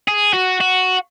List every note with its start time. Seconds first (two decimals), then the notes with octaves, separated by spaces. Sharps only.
0.08 G#4
0.34 F#4
0.61 F#4